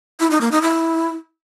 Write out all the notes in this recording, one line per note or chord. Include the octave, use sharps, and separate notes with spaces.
E4
D#4
A#3
D#4
E4